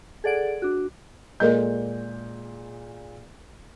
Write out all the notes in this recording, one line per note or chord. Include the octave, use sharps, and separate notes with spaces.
G#4 A4 D5 F#5 D7
D4 F#4
A#2 G#3 A4 A#4 D#5 G6